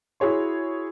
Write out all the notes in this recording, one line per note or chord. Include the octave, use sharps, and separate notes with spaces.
E4 F#4 G#4 C#5 C6